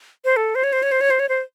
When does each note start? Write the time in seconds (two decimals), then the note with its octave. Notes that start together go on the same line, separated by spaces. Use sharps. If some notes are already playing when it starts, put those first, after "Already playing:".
0.25 C5
0.36 A4
0.55 C5
0.64 C#5
0.73 C5
0.83 C#5
0.92 C5
1.01 C#5
1.10 C5
1.19 C#5
1.29 C5